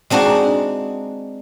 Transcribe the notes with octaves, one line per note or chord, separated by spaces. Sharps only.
G#3 C4 D4 D#4 F#4